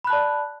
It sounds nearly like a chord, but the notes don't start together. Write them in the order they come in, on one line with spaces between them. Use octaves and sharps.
B5 F#6 A5 D5